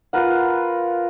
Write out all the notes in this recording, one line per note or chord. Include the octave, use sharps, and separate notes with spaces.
F4 A#4 B4 F#5